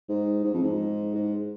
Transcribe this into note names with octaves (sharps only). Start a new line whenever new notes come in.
G#2
G#2
F2
G#2
G#2